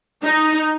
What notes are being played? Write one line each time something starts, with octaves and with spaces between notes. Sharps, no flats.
D#4